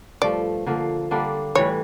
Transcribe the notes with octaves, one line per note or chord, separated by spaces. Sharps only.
G2 F3 A3 D5
D3 F3 A#3
D3 G3 A#3 D4
A2 E3 G3 C#5